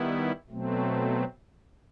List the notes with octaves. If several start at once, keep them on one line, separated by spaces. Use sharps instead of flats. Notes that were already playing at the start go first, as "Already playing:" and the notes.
Already playing: D#3 G3 B3 E4
B2 F#3 A3 C4